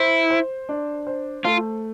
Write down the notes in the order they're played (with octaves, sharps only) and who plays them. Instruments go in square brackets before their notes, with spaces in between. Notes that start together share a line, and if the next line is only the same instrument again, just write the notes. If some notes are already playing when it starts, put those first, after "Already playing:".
Already playing: [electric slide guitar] E4 [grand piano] C5
[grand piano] C5
D4
C5
[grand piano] A3 [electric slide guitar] F4